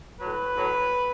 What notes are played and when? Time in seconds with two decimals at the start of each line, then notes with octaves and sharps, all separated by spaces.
0.20 A2 F#3 B4
0.56 A2 F#3